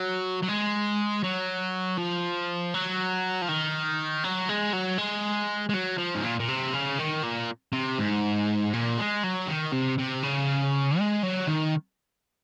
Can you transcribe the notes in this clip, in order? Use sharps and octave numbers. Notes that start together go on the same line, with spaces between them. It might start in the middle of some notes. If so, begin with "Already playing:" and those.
Already playing: F#3
F#3
G#3
F#3
F3
F#3
F3
D#3
F#3
G#3
F#3
G#3
G#3
F#3
F3
G#2
A#2
A#2
C3
C#3
D#3
A#2
C3
G#2
A#2
G#3
F#3
D#3
C3
C3
C#3
G#3
F#3
D#3